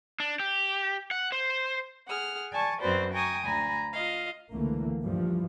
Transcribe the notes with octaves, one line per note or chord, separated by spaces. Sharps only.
D4
G4
F#5
C5
G#4 F#5 F6
D5 G#5 A5 C#6
F#2 C4 F#4 B4 C5 D5
G5 G#5 A#5 C#6 D#6
D2 G#5 A#5 B5
F4 D#5 F5
C#2 D3 E3 A3 A#3
G2 A#2 E3 F3 G3